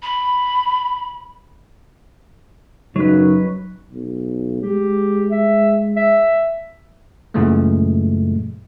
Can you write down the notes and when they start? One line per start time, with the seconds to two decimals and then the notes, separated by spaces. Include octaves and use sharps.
0.03 B5
2.96 F#2 C#3 F#3 D#4 B4
3.91 B1
4.63 G#3 G4
5.31 E5
5.96 E5
7.34 F#2 A#2 C#3 E3 G#3 A3